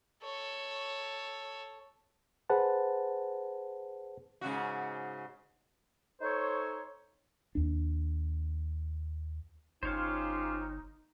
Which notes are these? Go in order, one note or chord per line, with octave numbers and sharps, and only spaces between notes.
A4 C#5
G#4 B4 C5 F#5 A5
G#2 C#3 F#4
D#4 A4 C5 C#5
D#2 D4
G1 C#4 D#4 F4 G4 C5 C#5 F5